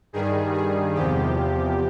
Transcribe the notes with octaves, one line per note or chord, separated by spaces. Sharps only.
G2 D#3 G3 G#4
G#4
E2 C3 F3 G4